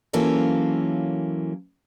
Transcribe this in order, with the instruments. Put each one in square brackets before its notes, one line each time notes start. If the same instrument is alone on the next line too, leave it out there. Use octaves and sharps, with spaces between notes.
[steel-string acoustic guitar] E3 F#3 A#3 C#4 F4 A4